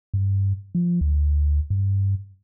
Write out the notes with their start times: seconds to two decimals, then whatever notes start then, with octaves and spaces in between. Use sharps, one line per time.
0.14 G2
0.75 F3
1.01 D2
1.70 G2